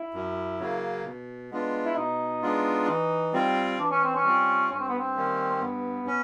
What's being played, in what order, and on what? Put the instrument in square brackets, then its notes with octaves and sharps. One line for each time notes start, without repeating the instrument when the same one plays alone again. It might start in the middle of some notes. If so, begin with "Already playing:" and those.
Already playing: [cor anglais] E4
[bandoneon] F#2
C#3 F#3 A#3
B2
G#3 B3 D4 F4
[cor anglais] E4
[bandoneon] B2 [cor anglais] D#4
[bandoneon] G#3 B3 D4 F4
E3
G3 C4 F4
[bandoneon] E3 [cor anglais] D4
[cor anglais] C#4
C4
C#4
[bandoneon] G3 C4 F4
[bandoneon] G2 [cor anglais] C#4
[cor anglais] C4
B3
C4
[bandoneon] D#3 G3 A#3 C#4
[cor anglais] C4
[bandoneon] G2 [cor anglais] B3
[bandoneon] C#4